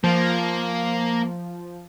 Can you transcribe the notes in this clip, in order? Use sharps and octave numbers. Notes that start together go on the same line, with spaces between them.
F3 A#3